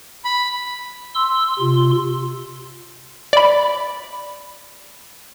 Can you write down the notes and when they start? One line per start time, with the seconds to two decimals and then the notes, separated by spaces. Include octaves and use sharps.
0.25 B5
1.15 C6 E6
1.59 C3 F4 C6
3.33 D5 B5